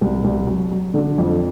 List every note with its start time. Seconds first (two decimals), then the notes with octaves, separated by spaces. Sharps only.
0.01 C2
0.24 C2
0.47 F#3
0.72 F#3
0.94 D3
1.18 F2